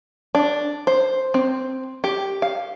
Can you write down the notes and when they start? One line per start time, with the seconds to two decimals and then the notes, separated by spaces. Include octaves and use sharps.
0.35 D4
0.87 C5
1.34 C4
2.04 G4
2.42 F5